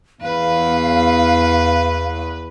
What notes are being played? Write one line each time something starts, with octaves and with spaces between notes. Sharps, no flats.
E2 B4 F5